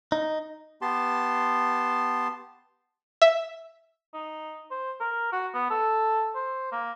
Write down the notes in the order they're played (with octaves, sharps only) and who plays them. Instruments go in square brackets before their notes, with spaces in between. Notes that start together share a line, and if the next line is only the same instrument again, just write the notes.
[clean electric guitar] D#4
[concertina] B3 G4 A5 C6
[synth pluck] E5
[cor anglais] D#4
C5
A#4
F#4
B3
A4
C5
A#3